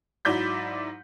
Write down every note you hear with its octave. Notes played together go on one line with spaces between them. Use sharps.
G#2 F#3 E4 D5 G6 B6